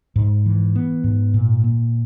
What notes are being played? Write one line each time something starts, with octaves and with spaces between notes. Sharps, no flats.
G#2
E3
B3
G#2
A#2
A#3